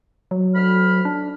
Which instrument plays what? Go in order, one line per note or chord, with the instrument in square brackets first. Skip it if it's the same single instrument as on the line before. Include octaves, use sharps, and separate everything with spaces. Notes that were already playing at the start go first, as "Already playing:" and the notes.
[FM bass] F#3
[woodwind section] D2 B5 F6
[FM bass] D4